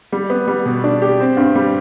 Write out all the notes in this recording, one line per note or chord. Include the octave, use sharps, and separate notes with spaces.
G3
B3
G3
B2
D4
G4
C4
G2
G3